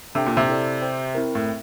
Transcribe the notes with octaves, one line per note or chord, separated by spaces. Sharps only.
C3 D4 A4 E5 G5
A#2
C3
E4 A4 D5
G4 C5 G5
C4 E4 A#4
A2